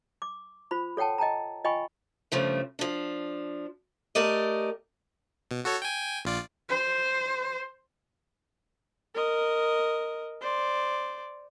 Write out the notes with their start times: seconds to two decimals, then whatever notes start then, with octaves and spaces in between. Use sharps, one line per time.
0.22 D6
0.71 F4 C5 B5
0.97 A4 C#5 F#5 G5 A5
1.18 D#5 G5 A5 A#5
1.64 F4 D#5 G5 G#5 B5 C#6
2.32 G2 C#3 F3 A3
2.79 F3 D4
4.15 A3 G4 A#4 D5 D#5
5.51 B2
5.65 F#4 A4 C#5
5.82 G5 G#5
6.25 A#1 F4 D5
6.69 C5
9.14 A#4 D#5
10.41 C5 D5